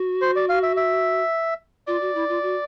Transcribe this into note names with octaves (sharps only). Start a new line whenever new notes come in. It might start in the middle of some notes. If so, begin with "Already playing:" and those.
Already playing: F#4
C5
D5
F5
E5
E5
F4 D5
F#4
E4
F4
F#4